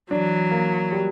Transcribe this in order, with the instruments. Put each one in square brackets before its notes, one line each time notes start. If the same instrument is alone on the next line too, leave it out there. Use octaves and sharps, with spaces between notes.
[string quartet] E3 F#3 [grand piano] D4
[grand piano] A#3
G3